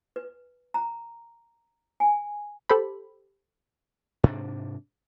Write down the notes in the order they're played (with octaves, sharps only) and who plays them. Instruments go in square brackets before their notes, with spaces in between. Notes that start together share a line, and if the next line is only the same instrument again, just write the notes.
[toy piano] B4
A#5
G#5
[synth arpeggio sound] G4 A4 C5 B5
[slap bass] G#2 C3 D4